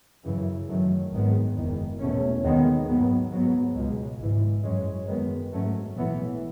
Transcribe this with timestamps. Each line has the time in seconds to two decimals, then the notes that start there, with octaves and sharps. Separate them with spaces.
0.24 F#2 C#3 E3
0.68 F#2 D#3 F#3 A3
1.12 G#1 G#2 D#3 G#3 B3
1.56 F#1 E2 D#3
1.99 E2 B2 A3 C#4
2.43 D#2 D#3 G#3 B3
2.87 G#2 F#3 B3
3.31 G#2 F#3 B3
3.75 C#2 B2 G#3
4.19 G#1 G#2 E3
4.63 F#2 E3 G#3 C#4
5.07 F#2 D#3 G#3 B3
5.51 G#2 F#3 A3 C#4
5.95 B1 A2 E3 B3